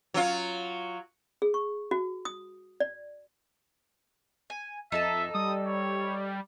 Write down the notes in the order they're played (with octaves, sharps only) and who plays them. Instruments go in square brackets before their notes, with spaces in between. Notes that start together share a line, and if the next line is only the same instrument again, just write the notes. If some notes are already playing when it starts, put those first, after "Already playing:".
[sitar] F#3 F4
[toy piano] G#4
C#6
F#4
D#6
D5
[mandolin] G#5
[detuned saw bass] F2 [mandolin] D#4 A4 A5 [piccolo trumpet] E5
[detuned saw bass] G3 [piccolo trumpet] D#6
[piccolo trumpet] C#5